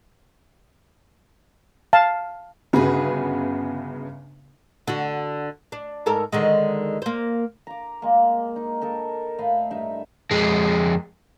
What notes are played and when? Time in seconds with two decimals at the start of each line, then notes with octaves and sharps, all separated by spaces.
1.93 F5 A5
2.73 G1 C#3 B3 F#4 G#4 B4
4.88 D3 F#4
5.72 D4
6.06 G#2 A4 A#4
6.32 D3 D#3 G#3
7.02 A#3 C5
7.67 A#5 D6
8.02 G#3 A#3
8.56 D#4
8.81 D#4 A4 A#4
9.38 A2 D#5 F5 B5
9.71 G2 D#4 E5
10.31 F2 G#3